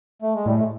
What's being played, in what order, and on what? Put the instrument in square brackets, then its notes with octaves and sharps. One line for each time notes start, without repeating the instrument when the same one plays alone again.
[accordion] A3
G#3
[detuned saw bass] A2 [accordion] G3
[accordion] A3